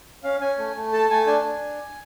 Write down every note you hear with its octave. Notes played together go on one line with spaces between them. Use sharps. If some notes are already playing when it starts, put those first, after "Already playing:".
C#4 F5
C#4 G#5
A3
A3
A4 A5
A3 G#5
D4 G#5
D4